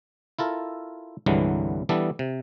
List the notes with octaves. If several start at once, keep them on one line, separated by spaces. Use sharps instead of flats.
E4 F4 A4 A#4
C2 G2 D3 E3 F#3 G#3
E3 G3 B3 D4 A4
C3